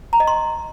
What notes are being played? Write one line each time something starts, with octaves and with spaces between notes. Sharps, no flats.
A#5
D#5
C6